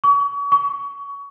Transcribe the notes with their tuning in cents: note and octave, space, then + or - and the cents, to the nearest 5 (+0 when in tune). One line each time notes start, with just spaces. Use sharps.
C#6 +40
C#6 +25